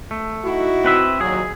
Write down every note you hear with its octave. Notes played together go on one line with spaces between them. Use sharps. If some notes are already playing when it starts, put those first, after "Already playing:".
A3
D#4 E4 F#4
C4 B4 E5
D#2 A#2 F#3 G#4